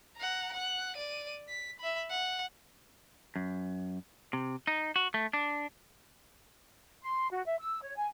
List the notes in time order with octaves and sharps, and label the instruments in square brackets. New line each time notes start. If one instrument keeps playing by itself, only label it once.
[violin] F#5 A#5
F#5 F#6
D5 D#7
B6
E5 B5
F#5
[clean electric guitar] F#2
C3
D#4
F#4
A3
D4
[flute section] C6
F#4
E5
E6
C#5
G#5